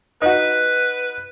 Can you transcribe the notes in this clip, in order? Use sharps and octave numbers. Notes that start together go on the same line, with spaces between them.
D#4 F#4 B4